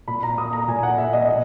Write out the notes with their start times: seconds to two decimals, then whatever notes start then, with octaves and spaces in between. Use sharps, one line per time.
0.08 A#2 B5
0.23 A#5
0.38 A#3 D#6
0.53 A#5
0.68 A#2 G#5
0.83 F#5
0.98 A#3 E5
1.13 D#5
1.27 B2 D#5